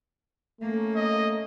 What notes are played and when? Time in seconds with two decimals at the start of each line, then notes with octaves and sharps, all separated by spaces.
0.61 A3 A#3 C#4
0.96 D#5